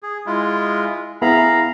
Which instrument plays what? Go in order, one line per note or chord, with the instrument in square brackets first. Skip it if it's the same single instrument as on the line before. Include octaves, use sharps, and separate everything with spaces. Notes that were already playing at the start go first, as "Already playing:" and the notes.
[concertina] G#4
G#3 E4 F4
[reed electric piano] B3 E4 G#4 [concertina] F5 A#5 B5